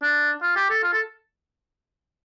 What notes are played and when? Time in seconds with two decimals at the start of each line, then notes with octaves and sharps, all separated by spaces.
0.03 D4
0.42 F4
0.56 G4
0.70 A4
0.84 F4
0.93 A4